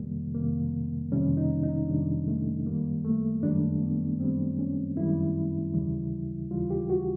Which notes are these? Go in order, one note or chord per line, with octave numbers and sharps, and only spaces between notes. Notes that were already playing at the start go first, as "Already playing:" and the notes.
Already playing: F2 C3 D#3 G3 A#3
F2 C3 D#3 G3 A#3
F2 C3 D#3 G3 C#4
D#4
D#4
F2 C3 D#3 G3 D4
A3
F#2 D#3 G3 A#3
A3
F#2 D#3 G3 D4
B3
F#2 D#3 G3 C4
C#4
F#2 D#3 G3 E4
D#2 C#3 E3 G3
D#2 C#3 E3 G3 F4
G4
F#4